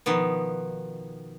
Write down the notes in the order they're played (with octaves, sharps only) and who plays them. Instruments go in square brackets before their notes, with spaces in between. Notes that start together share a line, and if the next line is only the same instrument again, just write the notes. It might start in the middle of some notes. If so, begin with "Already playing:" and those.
[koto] B2 D#3 F3 B3